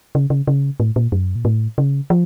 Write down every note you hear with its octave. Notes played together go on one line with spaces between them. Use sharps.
C#3
C#3
C#3
A2
A#2
F#2
A#2
A2
C#3
F3